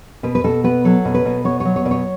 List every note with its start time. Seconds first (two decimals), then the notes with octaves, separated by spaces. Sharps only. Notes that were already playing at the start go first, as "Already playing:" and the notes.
0.23 B2 B4
0.35 B4
0.44 B2 A4
0.64 B3 B4
0.85 F#3 A4
1.05 B2
1.14 B4
1.25 B2
1.45 B3 C#5
1.60 C#5
1.65 F#3
1.76 C#5
1.85 B2 D5
1.91 C#5